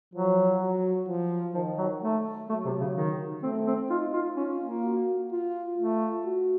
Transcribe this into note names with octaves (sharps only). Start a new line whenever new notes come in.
F3 F#3
F#3
F3
D#3 F3
F#3
A3
F#3 A3
C3
C#3
D#3
A3 C4
C4
D#4 F4
F4
C#4 F4
A#3
F#4
F4
A3 F4
F#4